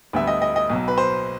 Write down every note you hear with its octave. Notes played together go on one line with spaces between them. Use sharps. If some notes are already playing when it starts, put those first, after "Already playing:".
D2 D3 G3 B3 E5
D#5
D#5
D#5
B1 B2 F#3
B4
C5